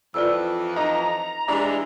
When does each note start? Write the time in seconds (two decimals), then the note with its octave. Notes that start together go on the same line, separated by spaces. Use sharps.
0.14 F2 E3 F4 D5 E6
0.76 D#4 A#5
1.48 E3 G3 G#3 D4